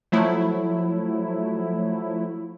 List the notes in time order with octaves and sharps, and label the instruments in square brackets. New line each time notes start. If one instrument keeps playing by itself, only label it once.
[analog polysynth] F3 F#3 A3 E4